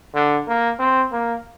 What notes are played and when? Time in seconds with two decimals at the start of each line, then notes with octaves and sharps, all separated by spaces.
0.14 D3
0.47 A#3
0.79 C4
1.12 A#3